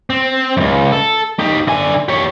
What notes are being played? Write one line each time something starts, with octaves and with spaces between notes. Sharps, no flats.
C4
C#2 F#2
A4
D#4 G4
D3 G#5
G4 C#5